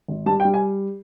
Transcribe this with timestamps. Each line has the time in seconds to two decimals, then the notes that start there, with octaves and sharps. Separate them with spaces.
0.08 G#1
0.26 G3 A5
0.40 G5
0.45 G3
0.54 G#5